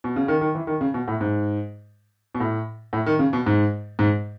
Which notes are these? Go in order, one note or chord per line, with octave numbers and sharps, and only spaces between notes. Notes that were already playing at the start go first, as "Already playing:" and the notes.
B2
C#3
D#3
D#3
E3
D#3
C#3
B2
A2
G#2
B2
A2
A2
D#3
C#3
B2
G#2
G#2